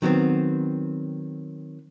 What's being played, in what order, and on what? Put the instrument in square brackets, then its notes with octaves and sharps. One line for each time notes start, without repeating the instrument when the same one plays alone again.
[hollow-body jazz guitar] D#3 F#3 B3 C4